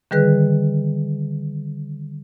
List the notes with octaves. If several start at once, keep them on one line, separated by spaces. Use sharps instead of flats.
D3 D#3 G3 G#4 B4 F#6